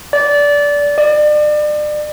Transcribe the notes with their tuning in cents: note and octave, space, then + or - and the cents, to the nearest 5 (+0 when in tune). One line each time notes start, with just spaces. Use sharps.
D5 -20
D5 +35